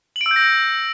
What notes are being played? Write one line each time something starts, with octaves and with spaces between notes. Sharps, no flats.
F#7
D7
E6
G6
A#6